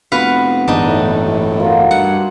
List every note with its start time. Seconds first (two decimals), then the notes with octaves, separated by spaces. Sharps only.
0.12 F1 B3 F#4 B4 F5
0.68 D1 G1 E2 G#2 D4 D#4
0.88 A2
1.60 F4 F#4 A#4
1.91 G2 F#5